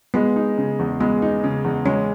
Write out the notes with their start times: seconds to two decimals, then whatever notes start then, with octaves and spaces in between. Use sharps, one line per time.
0.14 G#3 B3
0.36 D#4
0.58 C#3
0.79 E2
1.00 G#3 B3
1.22 D#4
1.44 C#3
1.64 E2
1.86 G#3 C#4